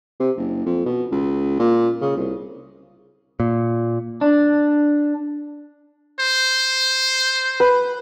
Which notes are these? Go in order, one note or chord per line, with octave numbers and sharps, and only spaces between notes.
C3
F#1
F2
B2
C#2
A#2
C#3
C2
A#2
D4
C5
B4